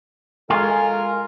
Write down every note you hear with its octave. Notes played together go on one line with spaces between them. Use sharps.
G#3 F4 A4 A#4 G#5